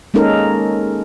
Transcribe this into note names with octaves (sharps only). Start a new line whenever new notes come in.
G#3 A#3 C#4 D#4 A4 A#4